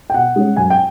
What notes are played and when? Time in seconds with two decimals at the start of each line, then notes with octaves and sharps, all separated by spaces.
0.10 G5
0.14 B2 F#5
0.36 G#3 C#4
0.56 F#2 G#5
0.70 G5